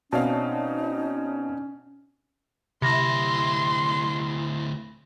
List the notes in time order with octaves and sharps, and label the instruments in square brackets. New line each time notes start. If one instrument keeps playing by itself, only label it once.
[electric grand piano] B2 C4 F5 [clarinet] C#4 [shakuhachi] D#4 [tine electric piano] C#5 D5 A5
[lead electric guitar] D2 E4 [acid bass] C3 [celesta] B5 A#6 [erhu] C6